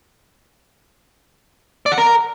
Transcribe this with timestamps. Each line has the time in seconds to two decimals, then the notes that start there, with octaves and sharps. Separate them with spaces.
1.86 D5
1.92 F#5
1.98 A#4